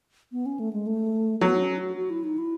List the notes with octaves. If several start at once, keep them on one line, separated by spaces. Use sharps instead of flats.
B3
C#4
A3
G#3
A3
F#3 B3
D#4
C#4
F#4
F#4
E4
D#4
E4